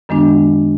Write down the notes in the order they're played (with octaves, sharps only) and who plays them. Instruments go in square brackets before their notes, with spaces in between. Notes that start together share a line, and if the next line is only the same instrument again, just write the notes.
[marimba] F#2 D#3 G#3 B3 D4